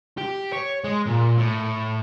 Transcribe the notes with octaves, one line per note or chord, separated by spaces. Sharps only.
G4
C#5
G#3
A#2
A2